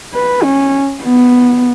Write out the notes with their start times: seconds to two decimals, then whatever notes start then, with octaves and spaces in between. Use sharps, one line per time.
0.13 B4
0.43 C#4
1.03 B3